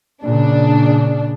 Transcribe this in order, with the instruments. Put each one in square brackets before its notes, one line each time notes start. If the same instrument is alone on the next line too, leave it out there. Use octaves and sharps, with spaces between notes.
[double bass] A#2 C#3 [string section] D4